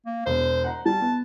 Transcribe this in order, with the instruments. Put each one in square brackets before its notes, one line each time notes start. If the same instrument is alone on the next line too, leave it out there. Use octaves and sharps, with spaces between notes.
[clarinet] A#3
[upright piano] E1 [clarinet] C5
[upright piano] F#5 A#5
[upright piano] G3 [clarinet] A5
[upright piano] B3